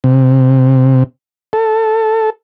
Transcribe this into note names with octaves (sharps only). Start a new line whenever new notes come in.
C3
A4